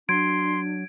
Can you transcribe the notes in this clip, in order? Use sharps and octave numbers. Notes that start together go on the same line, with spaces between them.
F#3 D4 C6 G#6 D7